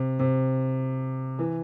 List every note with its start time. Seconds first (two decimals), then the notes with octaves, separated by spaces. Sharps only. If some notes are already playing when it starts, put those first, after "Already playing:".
Already playing: C3
0.19 C3
1.39 E3